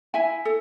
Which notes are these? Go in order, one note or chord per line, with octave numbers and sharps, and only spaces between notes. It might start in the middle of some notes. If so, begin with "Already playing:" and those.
E4 E5 G#5
A4